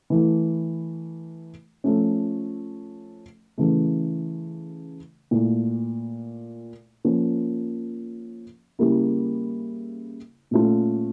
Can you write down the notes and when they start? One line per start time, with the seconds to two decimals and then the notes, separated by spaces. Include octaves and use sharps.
0.10 E3 A3 E4
1.84 F3 A3 C#4
3.58 C#3 E3 A3
5.31 A#2 A3 E4
7.05 F3 A#3 C#4
8.79 C#3 G3 A#3 E4
10.51 A#2 A3 C#4 F4